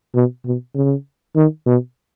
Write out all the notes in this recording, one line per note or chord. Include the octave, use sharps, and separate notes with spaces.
B2
B2
C#3
D#3
B2